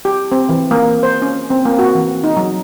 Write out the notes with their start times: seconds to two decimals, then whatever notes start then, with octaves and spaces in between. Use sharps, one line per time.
0.05 G4
0.32 C4
0.49 E3
0.71 A#3
1.03 C5
1.22 C#4
1.50 C4
1.65 A#3
1.79 F#4
1.95 E3
2.24 D#4
2.36 F#3